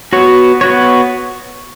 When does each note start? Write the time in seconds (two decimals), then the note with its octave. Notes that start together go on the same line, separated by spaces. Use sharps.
0.13 B3 F#4 C#5
0.61 B3 F#4 C#5